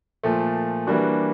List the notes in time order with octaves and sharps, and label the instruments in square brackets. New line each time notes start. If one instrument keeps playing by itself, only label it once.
[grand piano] A#2 F3 A3
E3 G3 A#3 D4 F#4